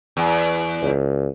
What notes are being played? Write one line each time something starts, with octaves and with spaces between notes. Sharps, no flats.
E2
C#2